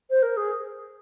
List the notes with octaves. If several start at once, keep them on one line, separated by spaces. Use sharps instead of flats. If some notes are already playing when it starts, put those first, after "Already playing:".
C5
A#4
G#4